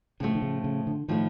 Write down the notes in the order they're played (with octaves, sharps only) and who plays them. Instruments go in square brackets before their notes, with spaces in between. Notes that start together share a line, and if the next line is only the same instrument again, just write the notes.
[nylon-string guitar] A2 F3 A3 [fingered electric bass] C#3
[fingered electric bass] D3
C#3
C#3
D3
[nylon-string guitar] A2 F3 A3 [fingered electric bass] D#3